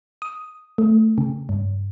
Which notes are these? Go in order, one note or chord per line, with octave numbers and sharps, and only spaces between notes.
D#6
A3
C#3
G2